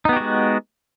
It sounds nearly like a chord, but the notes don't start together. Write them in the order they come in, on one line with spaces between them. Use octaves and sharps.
D#4 B3 G4 F#4 G#3